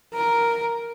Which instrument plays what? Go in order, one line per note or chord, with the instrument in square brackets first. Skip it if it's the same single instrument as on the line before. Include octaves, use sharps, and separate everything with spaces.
[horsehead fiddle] A#4